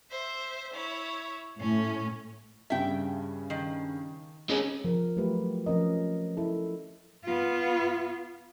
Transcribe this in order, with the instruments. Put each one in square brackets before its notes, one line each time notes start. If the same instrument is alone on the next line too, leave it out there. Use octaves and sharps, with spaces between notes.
[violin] C5 E5
E4 C#5
[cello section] A2 [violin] C#4
[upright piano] G2 C#3 G3 [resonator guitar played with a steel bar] E5 G5
[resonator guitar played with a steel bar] D#3
[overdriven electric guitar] G#3 C#4
[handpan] F3 A#4
F#3 A3 F4 G4 B4
F3 C4 C#4 F4 A#4 D#5
E4 A4
[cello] B3 F4